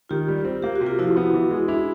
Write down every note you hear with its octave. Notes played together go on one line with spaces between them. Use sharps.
D#3 F4 G4
G3
C4
A#3 G4
F#4
C3
F4
F3 E4 F#4
B3
E3
G#3
D4 E4